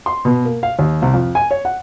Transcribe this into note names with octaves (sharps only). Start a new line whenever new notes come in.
C6
B2
A#3
F5
D#2
C2
F2
G#5
C#5
F#5